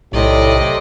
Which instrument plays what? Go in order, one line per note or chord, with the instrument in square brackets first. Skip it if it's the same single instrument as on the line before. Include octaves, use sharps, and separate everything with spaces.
[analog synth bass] B1 [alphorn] A2 [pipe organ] C3 [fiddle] D5 D#5